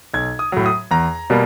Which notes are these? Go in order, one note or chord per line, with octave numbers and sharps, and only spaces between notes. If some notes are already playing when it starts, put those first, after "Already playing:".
B1 G#6
D#6
A2 F#3
D#6
E2 A#5
B2 G3 A#3